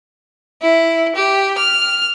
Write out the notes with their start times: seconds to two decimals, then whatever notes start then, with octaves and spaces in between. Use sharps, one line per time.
0.62 E4
1.15 G4
1.58 F6